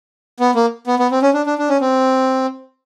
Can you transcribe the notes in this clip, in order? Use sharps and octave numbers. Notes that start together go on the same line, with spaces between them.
B3
A#3
B3
B3
C4
C#4
D4
D4
D4
C#4
C4